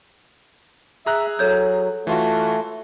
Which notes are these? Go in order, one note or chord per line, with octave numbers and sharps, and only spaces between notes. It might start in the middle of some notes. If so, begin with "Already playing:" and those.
G#4 E5 A#5 F#6
F#3 A4 C#5 G6
E3 A3 F4 F#4